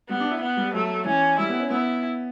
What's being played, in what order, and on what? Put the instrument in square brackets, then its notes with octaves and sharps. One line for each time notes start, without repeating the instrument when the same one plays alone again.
[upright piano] G3 [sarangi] B3
[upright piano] D4
E4
[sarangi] B3
[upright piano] G3
[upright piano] F#3 [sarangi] A3
[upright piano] E3 [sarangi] C#4
[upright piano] G3 [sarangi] E4
[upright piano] B3
C#4
[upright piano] B3 [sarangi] E4